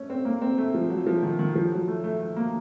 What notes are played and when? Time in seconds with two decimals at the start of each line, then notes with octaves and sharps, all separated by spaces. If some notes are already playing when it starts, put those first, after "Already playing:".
Already playing: A3 C#4
0.10 C4
0.25 A#3
0.41 C4
0.58 A3
0.74 F3
0.90 F#3
1.06 F3
1.23 D#3
1.39 D#3
1.55 F3
1.72 F#3
1.88 A3
2.04 A3
2.20 A3
2.36 A#3